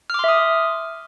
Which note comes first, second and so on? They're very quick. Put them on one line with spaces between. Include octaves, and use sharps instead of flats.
F6 D6 C6 E5 D#6